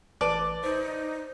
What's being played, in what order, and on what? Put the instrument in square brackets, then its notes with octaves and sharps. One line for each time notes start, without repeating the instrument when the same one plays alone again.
[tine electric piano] A1 [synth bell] B4 A5 D6 [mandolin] D5
[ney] D#4 [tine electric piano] C5